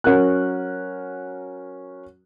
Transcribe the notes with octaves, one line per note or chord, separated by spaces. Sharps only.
F#3 C#4 A#4 F#5 F#6